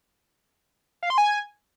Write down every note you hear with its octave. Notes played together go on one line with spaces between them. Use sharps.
F5
C6
G#5